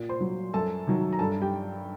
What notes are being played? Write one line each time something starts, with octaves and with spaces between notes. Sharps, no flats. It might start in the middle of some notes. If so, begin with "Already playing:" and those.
Already playing: A#2
C5 C6
F#3
F#2 A4 A5
D#3 F#3
A#5
G2 A4 A5
G4 G5